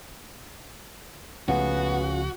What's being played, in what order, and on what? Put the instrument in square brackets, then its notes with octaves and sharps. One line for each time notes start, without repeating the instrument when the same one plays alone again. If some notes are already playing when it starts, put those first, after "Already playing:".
[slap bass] C#2 F3 A3 [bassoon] B3 [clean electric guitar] C#4 F4 G#4 [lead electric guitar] F#4